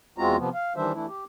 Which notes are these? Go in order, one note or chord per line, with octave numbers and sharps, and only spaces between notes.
E2 G#3 C4 F4 F#4 A#5
C3 F3 B3
F5
D#3 E3 G3 D4 C5 E5
E3 A3 D4 E4
G4